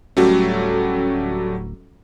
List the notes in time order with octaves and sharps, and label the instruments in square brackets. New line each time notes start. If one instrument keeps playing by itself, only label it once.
[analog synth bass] D1 [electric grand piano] F#3 G3 A3 [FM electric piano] C#4 F#4 A4